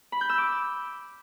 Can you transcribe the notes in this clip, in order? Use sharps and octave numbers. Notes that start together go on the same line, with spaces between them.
B5
G6
E6
D6